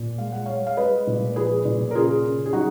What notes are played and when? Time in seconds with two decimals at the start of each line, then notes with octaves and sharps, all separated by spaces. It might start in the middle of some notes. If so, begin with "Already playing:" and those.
Already playing: A#2
0.18 G#3 F5
0.32 F#5
0.46 G#3 C#5 F5
0.67 F5
0.77 G#3 B4 D#5
1.07 A#2
1.36 F3 G#4 B4
1.65 A#2
1.91 A#4
1.95 C#3 F4 G#4
2.24 C#3
2.46 G#4
2.53 F#3 D#4 F#4